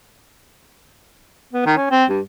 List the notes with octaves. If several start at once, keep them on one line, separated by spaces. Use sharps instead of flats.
B3
D#3
C#4
C4
G2